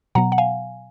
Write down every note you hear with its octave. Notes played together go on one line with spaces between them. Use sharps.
B2 F#3 B3 F#5 A#5
F#5
F5 G#5